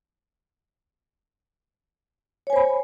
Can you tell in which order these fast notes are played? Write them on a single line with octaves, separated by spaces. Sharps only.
C#5 G#5 C5 B5